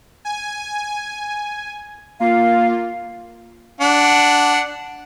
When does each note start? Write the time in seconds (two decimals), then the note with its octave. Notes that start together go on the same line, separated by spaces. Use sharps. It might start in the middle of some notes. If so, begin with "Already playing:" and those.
0.25 G#5
2.20 A#3 F4 F5
3.81 D4 F#5